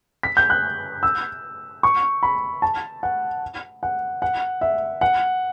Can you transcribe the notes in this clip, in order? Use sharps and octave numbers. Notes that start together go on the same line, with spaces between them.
B6
G6
F#6
E6
C#6
B5
A5
F#5
F#5
F#5
E5
F#5